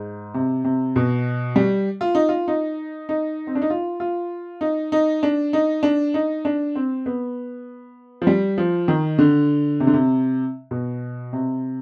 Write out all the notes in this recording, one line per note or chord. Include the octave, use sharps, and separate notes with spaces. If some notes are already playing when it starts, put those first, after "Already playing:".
Already playing: G#2
C3
C3
B2
G3
F4
D#4
F4
D#4
D#4
C4
D4
D#4
F4
F4
D#4
D#4
D4
D#4
D4
D#4
D4
C4
B3
F3
G3
F3
D#3
D3
C3
D3
C3
B2
C3